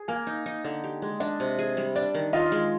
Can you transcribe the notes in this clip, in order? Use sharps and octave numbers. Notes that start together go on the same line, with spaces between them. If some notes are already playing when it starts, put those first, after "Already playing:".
Already playing: G#4
A#3 G#5
D#4
D#4
D3
G4
G#3
D4 D#5
C3
G#4
G3
D4 D5
D#3
F4 D#5
G#3